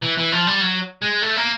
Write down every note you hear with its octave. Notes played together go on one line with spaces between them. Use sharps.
E3
E3
F3
G3
F#3
G#3
A3
A#3